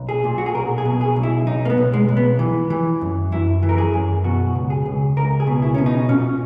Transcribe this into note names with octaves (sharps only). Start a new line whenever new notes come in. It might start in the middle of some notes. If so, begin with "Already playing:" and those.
Already playing: B1
G#4
A#2
F#4
G#4
B1 A#4
G#4
B2
G#4
B1
E4
B1 D#4
A#3
B3
B1
G#3
B1
B3
E3
E3
F#2
F#2 E4
E3
A#4
G#4
F#2
B2 F#4
C#2
G#4
C#2
C#2 A#4
G#4
B2
E4
B2 C#4
D#4
A#2 C#4